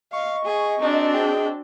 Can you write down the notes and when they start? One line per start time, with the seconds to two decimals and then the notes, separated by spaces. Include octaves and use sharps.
0.13 D#5 F5 C#6
0.44 G#4
0.81 C4 D4 D#4 F#4
1.14 G#4 G5